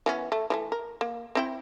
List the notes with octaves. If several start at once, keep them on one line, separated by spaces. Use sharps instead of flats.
E3 B3 C#4
A3
E3 G#3 A3
A#4
A#3
C4 E4 G5